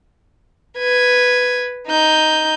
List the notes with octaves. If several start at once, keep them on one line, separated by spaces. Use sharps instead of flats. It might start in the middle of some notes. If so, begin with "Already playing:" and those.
B4 G#6
D#4 G6